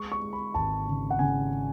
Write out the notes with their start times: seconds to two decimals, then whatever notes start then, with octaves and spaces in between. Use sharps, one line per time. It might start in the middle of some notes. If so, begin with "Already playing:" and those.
Already playing: G#3 C#6
0.12 C#6
0.22 G#3
0.33 B5
0.54 G#1 A5
0.87 C#3
1.10 F#5
1.19 C#3 G#5